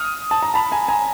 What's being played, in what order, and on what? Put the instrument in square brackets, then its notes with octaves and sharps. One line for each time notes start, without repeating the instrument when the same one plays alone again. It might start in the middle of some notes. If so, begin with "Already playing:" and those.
Already playing: [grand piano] D#6 F6
A5
A#5
A5 B5
G#5 A#5
G#5 A#5